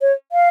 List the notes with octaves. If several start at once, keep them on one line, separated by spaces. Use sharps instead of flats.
C#5
F5